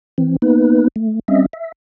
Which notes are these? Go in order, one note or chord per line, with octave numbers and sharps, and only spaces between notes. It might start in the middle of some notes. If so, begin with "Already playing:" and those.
E3 C4
A#3 B3 D#4 B4
A3
G3 C4 C#4 D#5 E5
E5